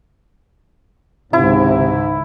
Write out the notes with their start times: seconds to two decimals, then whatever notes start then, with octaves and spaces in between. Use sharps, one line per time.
1.33 C#2 G#2 C3 D#3 E4